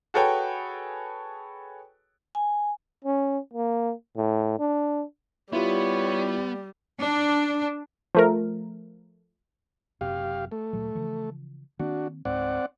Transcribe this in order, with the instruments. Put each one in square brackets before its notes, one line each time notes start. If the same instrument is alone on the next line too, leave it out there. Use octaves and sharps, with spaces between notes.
[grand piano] F#4 G#4 A4 B4 C#5 G5
[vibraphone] G#5
[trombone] C#4
A#3
A2
D4
[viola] G3 [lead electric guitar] B3 [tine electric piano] E4 F4 G4 [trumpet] C#5
[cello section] D4
[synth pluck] F3 A3 A#4
[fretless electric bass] F#1 F#2 C3 [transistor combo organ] G4 F5
[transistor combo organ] A3
[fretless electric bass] D2 A#2 F#3
C#3 E3 F3
[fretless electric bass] D#3 A#3 C4 [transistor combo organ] D4 F#4
[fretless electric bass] C#2 G#2 [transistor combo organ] C4 D5 F#5